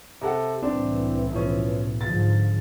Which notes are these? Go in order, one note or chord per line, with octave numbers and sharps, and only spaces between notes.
C3 A4 F#5
C2 A2 E3 C4 D4
B2 F3 C#4
G#2 D3 F3 A6